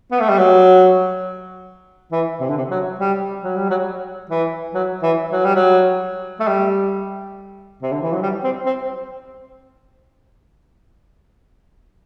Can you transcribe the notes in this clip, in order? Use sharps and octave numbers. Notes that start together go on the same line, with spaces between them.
B3
A3
G3
F#3
E3
C3
D3
C3
F#3
G3
F#3
G3
F#3
E3
F#3
E3
F#3
G3
F#3
A3
G3
C3
D3
E3
F#3
G3
C4
C4